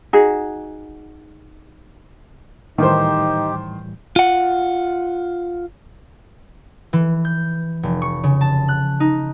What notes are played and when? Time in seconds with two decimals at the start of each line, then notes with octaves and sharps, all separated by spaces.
0.13 D#4 F#4 G#4
2.78 A2 D#3 E3 G3 D#4 G4 C5
4.16 F4 F#5
6.93 E3
7.25 G6
7.83 F1
8.02 C#6
8.24 C#3
8.41 A5
8.68 F#6
9.00 D#4